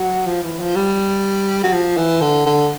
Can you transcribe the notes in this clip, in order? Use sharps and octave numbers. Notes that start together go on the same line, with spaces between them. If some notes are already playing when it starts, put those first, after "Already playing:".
Already playing: F#3
F3
E3
F3
G3
F#3
F3
E3
D3
D3